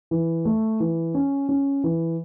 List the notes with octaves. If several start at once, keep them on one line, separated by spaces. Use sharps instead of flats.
E3
A3
E3
C#4
C#4
E3